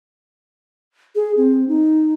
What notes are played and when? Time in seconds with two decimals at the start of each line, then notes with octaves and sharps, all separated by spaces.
1.15 G#4
1.37 C4
1.68 D#4